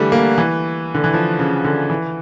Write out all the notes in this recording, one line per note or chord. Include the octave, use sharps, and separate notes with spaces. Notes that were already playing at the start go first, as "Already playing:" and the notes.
Already playing: D3 E3 G3 A3
A#3
E3
D3
E3
F3
C#3
D3
E3